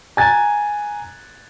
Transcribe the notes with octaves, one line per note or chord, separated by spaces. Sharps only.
G#5 A#5 F#6 G#6 A6